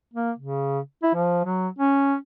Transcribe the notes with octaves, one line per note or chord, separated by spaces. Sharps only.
A#3
C#3
E4
F3
F#3
C#4